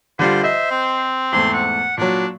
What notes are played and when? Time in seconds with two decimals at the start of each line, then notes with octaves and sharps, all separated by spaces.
0.19 D3 G3 F4 C5
0.43 C5 D#5 E5
0.71 C4
1.32 E2 G#2 A3 C6
1.53 F#5
1.98 A#2 F#3 D4